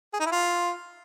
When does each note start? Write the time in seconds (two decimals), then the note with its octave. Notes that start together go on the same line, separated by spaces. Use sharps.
0.14 G#4
0.20 D#4
0.26 E4
0.32 F4